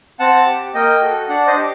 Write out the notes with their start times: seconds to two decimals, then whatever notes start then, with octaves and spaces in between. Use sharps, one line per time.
0.20 C4 F#5 A5
0.46 G4
0.74 A#3 D#5 G5
1.01 F#4 A4
1.29 D4 D5 F#5
1.47 C5 D#5
1.57 G4